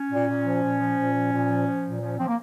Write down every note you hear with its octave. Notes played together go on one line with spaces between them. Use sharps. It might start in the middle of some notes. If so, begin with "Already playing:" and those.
Already playing: C#4
A#2
A#2
F3
A#2
F3
A#2
F3
A#2
F3
F3
A#2
F3 C#4
F3 C4
A#3